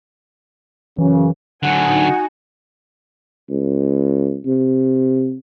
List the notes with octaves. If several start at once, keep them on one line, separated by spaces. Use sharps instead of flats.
F#2 C#3 E3
D3 F#3 D#4 F#4 F#5 G#5
C#2
C3